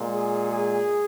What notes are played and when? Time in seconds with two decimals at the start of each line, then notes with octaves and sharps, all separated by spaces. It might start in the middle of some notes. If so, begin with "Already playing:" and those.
Already playing: A#2 G#3
0.12 G#4
0.49 G#4